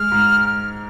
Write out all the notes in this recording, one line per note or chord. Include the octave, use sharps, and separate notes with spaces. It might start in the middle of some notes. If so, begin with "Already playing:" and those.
Already playing: G#3 F6
G#2